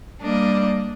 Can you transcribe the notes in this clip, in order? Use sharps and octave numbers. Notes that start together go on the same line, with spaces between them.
G3 A#3 D4 D#5